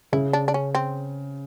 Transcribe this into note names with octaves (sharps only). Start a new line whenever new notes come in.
C#3 E4
D4
D4
C#4
C4